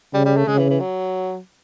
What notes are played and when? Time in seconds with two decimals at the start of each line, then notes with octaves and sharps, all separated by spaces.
0.13 C#3 G3
0.25 G3
0.36 A3
0.47 C#3 G#3
0.58 E3
0.69 E3
0.80 F#3